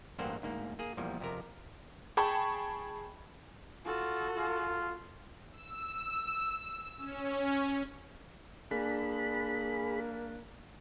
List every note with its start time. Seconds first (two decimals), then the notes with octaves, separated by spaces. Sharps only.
0.19 A1 G2 G3 A#3 C5 F#5
0.42 D2 G#2 A#3
0.79 A#3 G#4
0.97 E2 A#2 F3 G3
1.20 F2 C3 A#4
2.17 G#4 G5 A5 B5 C#6
3.85 F4 F#4 A4
4.36 F4
5.52 E6
6.97 C#4
8.71 A#3 D4 G#4 B5